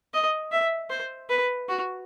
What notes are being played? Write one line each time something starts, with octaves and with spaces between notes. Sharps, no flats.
D#5
E5
C5
B4
F#4